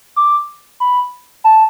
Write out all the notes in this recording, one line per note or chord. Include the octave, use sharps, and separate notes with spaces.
D6
B5
A5